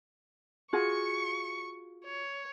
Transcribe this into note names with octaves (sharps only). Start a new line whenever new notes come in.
F4 F#4 G#4 C#6 C#7
C#5